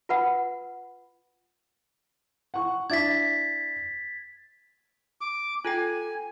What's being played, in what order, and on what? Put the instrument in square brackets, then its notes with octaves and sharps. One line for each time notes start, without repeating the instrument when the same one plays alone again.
[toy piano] F4 B4 F#5 B5
[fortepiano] F#5 C#6
[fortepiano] D4 E4 [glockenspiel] G#6 A6 B6
[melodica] D6
[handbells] F4 A4 G5 [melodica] G#5